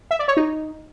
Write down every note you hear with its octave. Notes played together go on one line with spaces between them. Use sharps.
E5
D5
C#5
D#4